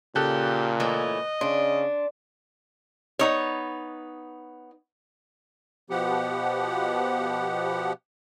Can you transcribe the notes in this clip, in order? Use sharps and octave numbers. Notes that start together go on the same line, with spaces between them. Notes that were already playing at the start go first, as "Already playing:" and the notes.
A#2 C#3 G4 A4 F#6
E3 A3 C#4 D#5
C#3 D4 C6
B3 D#4 C#5
B2 F3 B3 G4 F#5